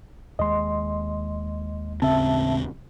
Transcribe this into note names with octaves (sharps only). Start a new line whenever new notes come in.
D#2 G#3 D#5 C6
A1 C#3 C4 E5 A5